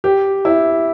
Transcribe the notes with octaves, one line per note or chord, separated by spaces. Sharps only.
G4
E4